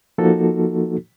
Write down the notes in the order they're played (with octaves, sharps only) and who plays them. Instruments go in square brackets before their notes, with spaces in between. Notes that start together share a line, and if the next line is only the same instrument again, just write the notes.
[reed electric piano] F3 A#3 D#4 F#4 A4